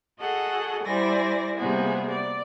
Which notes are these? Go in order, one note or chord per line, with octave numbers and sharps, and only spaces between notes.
F#4 G#4 A4 D#5 F#5
G3 E4 C5 D5 G#5 A#6
C3 G3 A#3 B3 F#4 G#4
D5